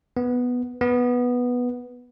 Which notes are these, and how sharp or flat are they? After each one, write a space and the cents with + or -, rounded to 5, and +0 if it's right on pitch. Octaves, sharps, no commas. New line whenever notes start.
B3 +0
B3 -5